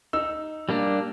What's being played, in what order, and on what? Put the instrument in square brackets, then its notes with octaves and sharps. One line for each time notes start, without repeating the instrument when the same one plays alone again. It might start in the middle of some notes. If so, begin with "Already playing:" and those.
[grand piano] D#4 E6
[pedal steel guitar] G3 A#3 D4